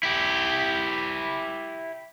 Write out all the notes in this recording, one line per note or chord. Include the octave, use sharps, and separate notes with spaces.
E4 G4